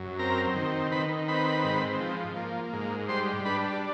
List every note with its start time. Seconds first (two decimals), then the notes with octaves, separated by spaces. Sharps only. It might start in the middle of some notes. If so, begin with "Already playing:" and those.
Already playing: F#2
0.19 C4 A#4 A#5
0.56 D#3
0.91 D#3 B4 B5
1.28 C4 B4 B5
1.64 G#2
2.01 F3
2.36 A#3
2.73 G#2
3.08 G3 C5 C6
3.45 D4 B4 B5